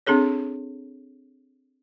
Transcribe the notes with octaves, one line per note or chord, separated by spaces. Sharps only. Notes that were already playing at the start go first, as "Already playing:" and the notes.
C4 D4 G#4 A4 C#5